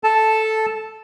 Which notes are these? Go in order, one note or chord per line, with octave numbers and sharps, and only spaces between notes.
A4 A5